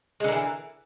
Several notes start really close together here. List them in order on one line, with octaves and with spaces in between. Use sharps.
G#3 D3 A#3 E3